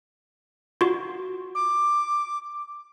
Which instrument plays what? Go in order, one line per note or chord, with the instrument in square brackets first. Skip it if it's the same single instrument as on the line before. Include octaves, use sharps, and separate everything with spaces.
[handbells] F4 F#4
[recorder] D6